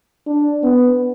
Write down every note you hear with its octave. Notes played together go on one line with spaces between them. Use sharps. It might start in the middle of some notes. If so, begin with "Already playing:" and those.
D4
B3